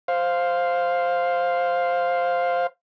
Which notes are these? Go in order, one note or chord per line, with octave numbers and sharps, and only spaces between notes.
C5 F5